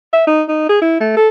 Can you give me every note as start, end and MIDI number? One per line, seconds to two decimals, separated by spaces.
0.13 0.26 76
0.27 0.43 63
0.48 0.65 63
0.69 0.78 68
0.81 0.99 64
1.00 1.12 57
1.17 1.29 69